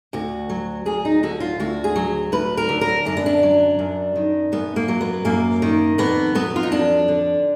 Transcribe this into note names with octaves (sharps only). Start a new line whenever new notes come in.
D2 F#4
F#3
D2 G#4
D#4
D3 F#4
F4
D2 F#4
G#4
F#3
D2 B4
A#4
D3
A#4
F#2 D4
B3
D4
F#3
F#2
D#3
F#2 B3
A#3
F#3
B3
F#2 A#3
D#3
F2 B3
F#3 B3
F4
D#4
F2 D4
D3